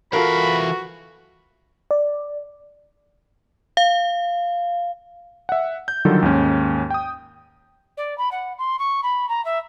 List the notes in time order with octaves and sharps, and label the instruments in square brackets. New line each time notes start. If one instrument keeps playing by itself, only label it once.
[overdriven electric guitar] E3 F5 [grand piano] F4 A4 A#4 [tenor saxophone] F#4 [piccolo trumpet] B5
[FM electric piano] D5
[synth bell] F5
[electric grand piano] E5 F#5
G6
D3 D#3 F#3 G3 F4 A4
D#2 G#2 C#4
G5 D#6
[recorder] D5
B5
F#5
C6
C#6
B5
A#5
E5